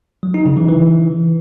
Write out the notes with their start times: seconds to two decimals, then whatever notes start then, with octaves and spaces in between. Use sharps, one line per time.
0.23 F#3
0.34 D#4
0.46 C#3
0.57 E3
0.68 E3